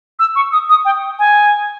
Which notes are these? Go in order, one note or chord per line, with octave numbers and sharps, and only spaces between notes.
E6
C#6
D#6
D#6
G5
G#5